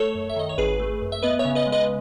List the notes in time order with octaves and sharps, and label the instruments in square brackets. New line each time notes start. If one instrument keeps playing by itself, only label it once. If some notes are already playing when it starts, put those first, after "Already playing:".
Already playing: [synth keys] A3 A4 C#5
F#2
E5
D#3 D#5
C#5
G#1 G#4 B4
A3
F#2
E5
B3 B4 D#5
C#5 E5
C#3
B4 D#5
G#3
B4 D#5